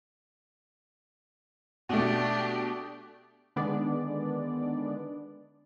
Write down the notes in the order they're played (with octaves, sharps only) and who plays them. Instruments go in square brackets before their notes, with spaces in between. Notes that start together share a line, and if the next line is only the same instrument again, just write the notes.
[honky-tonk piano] B2 A3 [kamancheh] D4 G4
[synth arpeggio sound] D3 D#3 G#3 B3 D4 D5